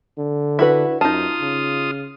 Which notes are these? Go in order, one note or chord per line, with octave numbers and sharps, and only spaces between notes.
D3
E4 F#4 B4
F#2 D#4 F4 A5 D#6
C#3